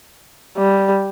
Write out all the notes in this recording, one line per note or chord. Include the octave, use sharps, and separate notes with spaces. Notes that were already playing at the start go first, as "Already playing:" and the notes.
G3